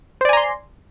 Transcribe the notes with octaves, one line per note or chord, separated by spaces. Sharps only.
C5 D5 G#5 A#5 C6